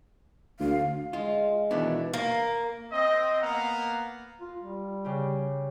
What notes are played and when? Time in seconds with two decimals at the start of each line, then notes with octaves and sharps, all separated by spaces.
0.60 D2 F5
1.13 G#3 F4
1.71 B2 D#3 E3 B3 D4
2.13 A#3
2.92 C4 D#5
3.42 A#3 B3 F5 F#5 A#5
4.41 F4
4.58 G3
5.05 C#3 G4